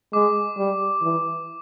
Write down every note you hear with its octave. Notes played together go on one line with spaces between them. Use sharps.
G#3 D6
G3
E3